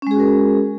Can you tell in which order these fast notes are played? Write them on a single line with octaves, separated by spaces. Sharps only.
C#4 G#3 G#4 F#4 A#4